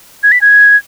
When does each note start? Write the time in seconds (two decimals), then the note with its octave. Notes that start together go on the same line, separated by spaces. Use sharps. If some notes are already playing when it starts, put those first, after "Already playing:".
0.23 G#6
0.32 B6
0.42 G#6